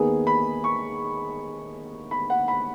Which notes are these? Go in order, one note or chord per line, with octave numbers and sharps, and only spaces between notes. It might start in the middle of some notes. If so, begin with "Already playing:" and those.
Already playing: D#2 D#3 B3 G#4
B5
C#6
B5
F#5
B5